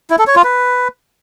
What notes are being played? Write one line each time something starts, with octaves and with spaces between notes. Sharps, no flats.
E4
A4
C#5
F4
B4